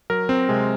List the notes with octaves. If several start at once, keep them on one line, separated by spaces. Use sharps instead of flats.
F#3 A#4
C4
C3 G#3